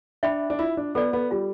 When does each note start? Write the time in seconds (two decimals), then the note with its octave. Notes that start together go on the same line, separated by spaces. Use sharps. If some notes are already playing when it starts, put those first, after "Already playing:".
0.23 D4 E5 G5 B5
0.50 D4
0.59 E4 F4
0.77 D4
0.95 B3 A4 D5
1.13 B3
1.31 G3 F4